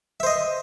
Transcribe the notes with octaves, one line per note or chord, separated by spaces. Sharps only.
C5 D#5 E5